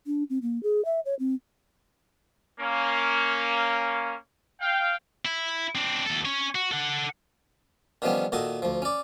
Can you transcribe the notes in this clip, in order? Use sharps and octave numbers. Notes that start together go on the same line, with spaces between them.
D4
C4
A#3
G#4
E5
C#5
C4
A#3 C#4
F5 G5
E4
C4 D4
D#2 A4
C#4 C#5
F#4
A4 F#5
D3 D#3 F3 G3 B3 C#4
A#2 D#3 F#4 A4 D#5
D2 F3
C#4 D5